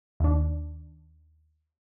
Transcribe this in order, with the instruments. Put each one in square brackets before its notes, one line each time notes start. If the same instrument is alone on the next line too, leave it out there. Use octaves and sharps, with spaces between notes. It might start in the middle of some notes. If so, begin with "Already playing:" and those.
[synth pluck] D#2 D4